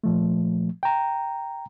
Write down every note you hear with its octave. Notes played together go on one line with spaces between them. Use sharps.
A#2 F3 A3
G5 A#5